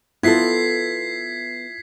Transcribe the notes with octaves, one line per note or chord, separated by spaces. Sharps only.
B3 E4 F4 A4 G#6 B6 C7